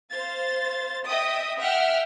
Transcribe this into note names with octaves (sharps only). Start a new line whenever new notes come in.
C5 F5 A6
D#5 E5 G5 D#6
E5 F#5 G5 F6